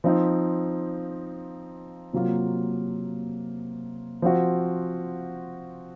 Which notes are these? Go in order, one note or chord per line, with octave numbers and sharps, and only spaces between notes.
F3 C4 D#4
C3 F#3 A#3 F4
F3 C4 F#4